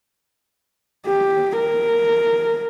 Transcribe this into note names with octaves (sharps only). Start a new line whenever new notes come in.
G4
A#4